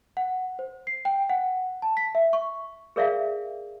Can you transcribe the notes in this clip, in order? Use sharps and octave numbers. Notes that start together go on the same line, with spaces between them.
F#5
C5
C7
G5
F#5
A5
B6
E5
C#6
G#4 A#4 D5 E5 F5